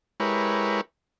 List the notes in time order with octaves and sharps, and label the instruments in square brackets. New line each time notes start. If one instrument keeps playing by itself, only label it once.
[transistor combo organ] G#3 E4 G4 A#4 B4 C#5